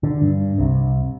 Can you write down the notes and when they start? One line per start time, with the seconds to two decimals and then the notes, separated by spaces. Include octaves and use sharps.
0.03 D3
0.22 G2
0.58 C2 C3